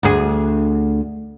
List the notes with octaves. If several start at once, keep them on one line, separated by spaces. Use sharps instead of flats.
D2 G#4